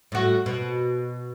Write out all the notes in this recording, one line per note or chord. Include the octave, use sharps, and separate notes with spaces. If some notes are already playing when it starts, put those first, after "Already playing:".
A2 F#4
B2